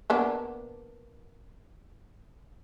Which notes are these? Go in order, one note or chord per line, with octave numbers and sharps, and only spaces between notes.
A#3 B3 D4